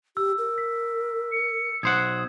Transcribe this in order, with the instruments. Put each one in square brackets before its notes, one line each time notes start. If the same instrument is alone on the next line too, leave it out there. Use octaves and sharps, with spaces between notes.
[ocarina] G4 [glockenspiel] E6
[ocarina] A#4
[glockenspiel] B6
[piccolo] C#7
[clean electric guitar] B1 C5 F#5 [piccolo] D#6 [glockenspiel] G#6